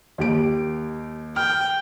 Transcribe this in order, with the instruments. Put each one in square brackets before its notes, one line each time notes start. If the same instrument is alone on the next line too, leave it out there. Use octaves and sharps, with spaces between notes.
[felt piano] D#2 G4 D7
[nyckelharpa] G5 [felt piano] F6